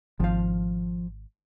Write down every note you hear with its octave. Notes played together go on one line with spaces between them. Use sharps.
G#1 F3 F5